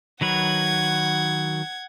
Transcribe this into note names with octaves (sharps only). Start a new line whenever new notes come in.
D#3 F#3 B4 F#5 G#6